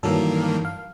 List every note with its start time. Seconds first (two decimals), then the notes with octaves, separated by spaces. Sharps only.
0.03 G2 D#3 E3 F#3 A#3 A4
0.65 F5